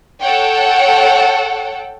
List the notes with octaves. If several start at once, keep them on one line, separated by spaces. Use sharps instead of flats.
A4 C#5 F#5 G5